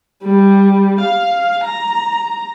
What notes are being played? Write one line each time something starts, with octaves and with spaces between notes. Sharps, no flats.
G3
F5
A#5